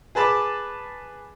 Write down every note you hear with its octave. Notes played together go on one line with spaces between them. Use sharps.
G#4 B4 A5 B5 D6